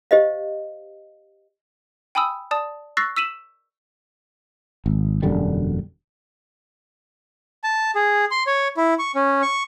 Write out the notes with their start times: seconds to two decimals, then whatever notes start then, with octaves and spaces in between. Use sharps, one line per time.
0.11 G4 C5 D#5 F5
2.15 G5 G#5 B5 D#6 E6
2.51 D5 A5 D#6
2.97 C#6 E6 F#6 A6 A#6 C7
3.17 E6 B6 D#7 E7 F#7
4.86 G#1
5.22 E1 F#2 D3 G3
7.64 A5
7.95 G#4
8.31 C6
8.47 C#5
8.77 E4
8.99 C#6
9.15 C#4
9.42 C#6